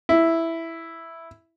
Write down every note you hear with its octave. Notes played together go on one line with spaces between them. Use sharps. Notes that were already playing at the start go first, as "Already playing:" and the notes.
E4